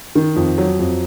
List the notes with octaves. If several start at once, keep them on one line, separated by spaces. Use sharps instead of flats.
D#3
F2
F#3
F2